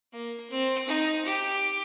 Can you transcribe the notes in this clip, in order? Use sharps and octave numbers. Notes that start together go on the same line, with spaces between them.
A#3
C4
D#4
G4